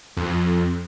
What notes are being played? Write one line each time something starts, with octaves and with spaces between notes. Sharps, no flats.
F2